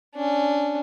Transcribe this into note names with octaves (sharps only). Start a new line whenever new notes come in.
C#4 D4